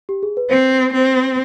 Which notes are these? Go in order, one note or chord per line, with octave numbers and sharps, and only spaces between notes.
G4
G#4
B4
C4 C5
C4 C5